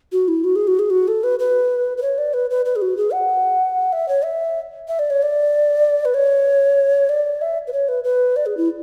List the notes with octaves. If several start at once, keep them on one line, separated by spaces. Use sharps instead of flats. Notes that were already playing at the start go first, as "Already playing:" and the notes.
F#4
E4
F#4
G#4
F#4
G#4
F#4
A4
B4
B4
B4
C#5
D5
B4
B4
B4
G#4
F#4
G#4
F#5
E5
C#5
E5
E5
D5
C#5
D5
B4
C#5
D5
E5
B4
C#5
B4
B4
D5
G#4
E4